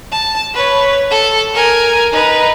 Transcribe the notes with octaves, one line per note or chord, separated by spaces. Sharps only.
A5
B4 C#5
A4
A#4 G#5
D#4 B4